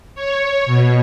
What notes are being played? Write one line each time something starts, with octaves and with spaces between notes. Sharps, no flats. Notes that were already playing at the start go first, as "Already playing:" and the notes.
C#5
B2